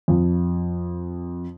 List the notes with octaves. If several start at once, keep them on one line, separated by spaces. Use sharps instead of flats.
F2